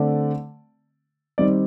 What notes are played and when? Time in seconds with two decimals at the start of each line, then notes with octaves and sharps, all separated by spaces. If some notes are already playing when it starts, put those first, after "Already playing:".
Already playing: D3 A3 C4 D5
1.38 D#3 G3 C4 D5